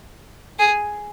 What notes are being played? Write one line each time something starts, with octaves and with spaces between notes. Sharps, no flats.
G#4